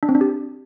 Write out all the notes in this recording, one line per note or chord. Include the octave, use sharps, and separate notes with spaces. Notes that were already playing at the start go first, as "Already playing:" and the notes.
D4
C4
D4
G4